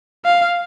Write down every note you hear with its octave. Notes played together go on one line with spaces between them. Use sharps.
F5